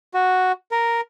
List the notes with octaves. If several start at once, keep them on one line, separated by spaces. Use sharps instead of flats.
F#4
A#4